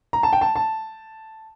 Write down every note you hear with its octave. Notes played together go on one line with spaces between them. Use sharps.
A#5
A5
G5
A5
A5